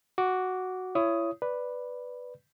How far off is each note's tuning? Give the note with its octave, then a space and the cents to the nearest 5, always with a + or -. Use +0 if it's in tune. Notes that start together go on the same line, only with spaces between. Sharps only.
F#4 +0 D6 -15
E4 +30 C#5 +10 D#6 +5
B4 +0 D5 +0